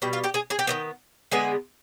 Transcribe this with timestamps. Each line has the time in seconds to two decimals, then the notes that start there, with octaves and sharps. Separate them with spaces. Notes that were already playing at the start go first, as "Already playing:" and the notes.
0.02 B2 G3 G5
0.13 F4 F5
0.24 G4 G5
0.34 G#4 G#5
0.50 G#4 G#5
0.59 G4 G5
0.67 D#3 G3 B3
1.31 D3 G#3 B3 G#4 G#5